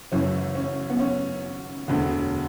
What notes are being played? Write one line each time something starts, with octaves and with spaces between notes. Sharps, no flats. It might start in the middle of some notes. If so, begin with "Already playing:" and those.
F#1 F#2 E3 C#4
C#4
B3
C#4
E1 D2 D3